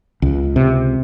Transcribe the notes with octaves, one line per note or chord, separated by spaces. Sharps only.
C#2
C3